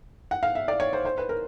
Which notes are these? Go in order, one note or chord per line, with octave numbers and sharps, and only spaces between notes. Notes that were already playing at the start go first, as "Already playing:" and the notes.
F#5
F5
E5
D5
C#5
C5
C5
B4
A#4